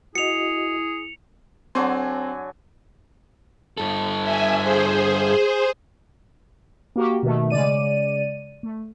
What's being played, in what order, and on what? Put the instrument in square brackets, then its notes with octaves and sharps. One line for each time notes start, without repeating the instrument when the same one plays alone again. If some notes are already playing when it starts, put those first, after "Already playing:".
[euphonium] E4 [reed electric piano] F#4 D#5 [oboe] G#4 [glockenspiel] C#7 F7
[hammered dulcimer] D3 F#3 G#5 [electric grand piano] C4 C6
[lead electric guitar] G2 A4
[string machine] E5 G#5
G#4 C5
[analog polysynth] A#3 F#4 G4
B2 D#3 A3
C#3 G#3 D5 D#7
A3